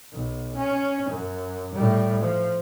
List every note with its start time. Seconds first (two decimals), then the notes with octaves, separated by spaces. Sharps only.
0.12 B1
0.56 C#4
1.09 F#2
1.74 A2 G3
2.21 F3